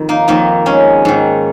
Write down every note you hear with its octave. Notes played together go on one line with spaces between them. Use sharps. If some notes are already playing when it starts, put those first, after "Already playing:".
Already playing: F2 D#3
A#3 D#4
F2 D#3 A#3 D#4
G#3 C#4
G#2 D#3